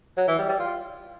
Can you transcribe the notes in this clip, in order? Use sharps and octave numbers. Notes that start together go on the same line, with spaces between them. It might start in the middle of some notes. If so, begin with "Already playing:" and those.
F#3
E3
G3
G3
F4